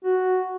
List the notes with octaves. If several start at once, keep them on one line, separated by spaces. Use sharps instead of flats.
F#4